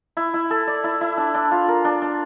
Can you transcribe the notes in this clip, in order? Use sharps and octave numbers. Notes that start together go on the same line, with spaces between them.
E4
E4
A4
D5
E4
E4
D4
D4
F4
A#4
D4
D4